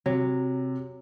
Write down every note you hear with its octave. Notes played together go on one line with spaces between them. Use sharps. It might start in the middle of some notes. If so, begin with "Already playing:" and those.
C3 F#3